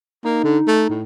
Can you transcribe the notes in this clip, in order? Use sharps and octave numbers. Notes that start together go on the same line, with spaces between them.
A#3 D#4
D3
A3
A2